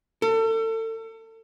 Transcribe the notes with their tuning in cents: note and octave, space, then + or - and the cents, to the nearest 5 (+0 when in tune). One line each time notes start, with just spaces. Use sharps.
A4 +35